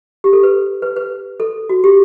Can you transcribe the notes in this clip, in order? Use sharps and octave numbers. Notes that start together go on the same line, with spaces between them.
G4
A4
B4
B4
B4
A4
F#4
G4